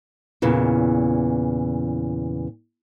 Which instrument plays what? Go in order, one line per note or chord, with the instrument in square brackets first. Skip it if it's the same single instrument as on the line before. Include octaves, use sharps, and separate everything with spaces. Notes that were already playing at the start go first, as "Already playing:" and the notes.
[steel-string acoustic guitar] E2 A#2 C#3 E3